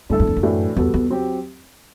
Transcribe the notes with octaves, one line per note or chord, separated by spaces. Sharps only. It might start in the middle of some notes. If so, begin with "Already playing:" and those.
G2 D3 A3 E4 A4
F#2
E2
F#2
A2 E3 A3 D4 F#4
E2 G3 B3 F#4 A4
E2
F#3 C4 G4